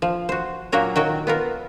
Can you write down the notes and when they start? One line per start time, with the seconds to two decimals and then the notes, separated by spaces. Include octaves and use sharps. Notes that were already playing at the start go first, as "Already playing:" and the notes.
0.02 F3
0.29 F#4 C5
0.72 A#2 F#3 A#3 F#4 A#4 C#5
0.96 D#3 F#3 F#4 G5
1.27 B3 F4 A#4